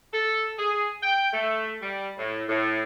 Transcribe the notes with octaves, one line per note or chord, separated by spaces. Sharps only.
A4
G#4
G5
A3
G3
A2
A2